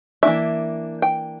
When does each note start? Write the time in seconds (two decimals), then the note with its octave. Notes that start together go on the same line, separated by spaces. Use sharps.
0.23 E3 A#3 D4 E5
1.02 G5